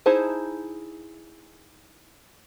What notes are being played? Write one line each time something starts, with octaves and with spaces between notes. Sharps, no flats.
D#4 E4 G#4 C5 A5